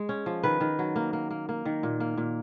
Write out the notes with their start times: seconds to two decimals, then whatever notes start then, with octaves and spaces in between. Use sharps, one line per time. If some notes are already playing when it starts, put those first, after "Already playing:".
Already playing: G#3
0.09 C#4
0.26 F3
0.43 D#3 B4
0.60 D#3
0.79 F#3
0.96 A#3
1.13 A#3
1.30 A#3
1.49 A#3
1.65 D#3
1.83 A#2
2.00 A#3
2.17 A#2